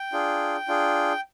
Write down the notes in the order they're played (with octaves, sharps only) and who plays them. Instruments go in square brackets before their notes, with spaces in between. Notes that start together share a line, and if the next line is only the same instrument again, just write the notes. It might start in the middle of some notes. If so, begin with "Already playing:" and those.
Already playing: [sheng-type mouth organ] G5
D4 F4 G#4
D4 F4 G#4